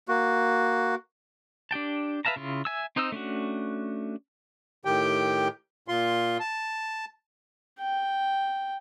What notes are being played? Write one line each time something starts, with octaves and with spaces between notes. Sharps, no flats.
A#3 F#4
D4 G4 G5 A5
B4 E5 F5 A5 A#5
C#3 E4 F4
E5 G#5 E6
C4 D#4 C5 D#5 E6
A3 C#4 D4 F#4
A2 D#3 G4 G5
A#2 F4 C6
A5
G5